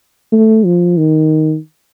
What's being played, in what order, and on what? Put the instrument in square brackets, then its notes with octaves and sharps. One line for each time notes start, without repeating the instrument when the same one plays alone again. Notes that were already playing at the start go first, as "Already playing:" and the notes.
[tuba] A3
F3
D#3